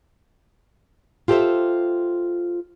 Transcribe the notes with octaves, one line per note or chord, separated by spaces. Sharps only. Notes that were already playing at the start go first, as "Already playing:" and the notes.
F4 G4 A4 A#4 C5 E5